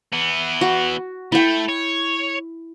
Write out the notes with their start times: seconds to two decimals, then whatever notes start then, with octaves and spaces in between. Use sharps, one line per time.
0.12 E3 B3
0.61 F#4
1.32 A3 E4 G5
1.68 C#5